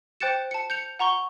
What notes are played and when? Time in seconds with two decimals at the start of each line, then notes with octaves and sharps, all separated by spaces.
0.20 C5 G5 F#6 A6 C#7 E7
0.51 A5 C#7
0.70 G6 C#7 F7
0.99 F#5 A#5 C#6 G7